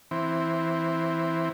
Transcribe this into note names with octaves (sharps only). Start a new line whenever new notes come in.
E3 C4